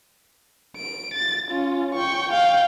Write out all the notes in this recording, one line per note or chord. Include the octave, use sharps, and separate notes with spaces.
D7
A6
C#4 F4
G5 C#6
F5 G5